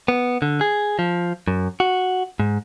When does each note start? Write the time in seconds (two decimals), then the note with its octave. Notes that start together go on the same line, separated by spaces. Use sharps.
0.08 B3
0.42 D3
0.61 G#4
0.99 F3
1.47 F#2
1.80 F#4
2.39 G#2